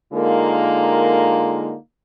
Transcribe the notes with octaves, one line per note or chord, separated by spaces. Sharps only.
D3 G#3 A#3 D#4 F4 A#4